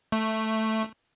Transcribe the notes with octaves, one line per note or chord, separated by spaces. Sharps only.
A3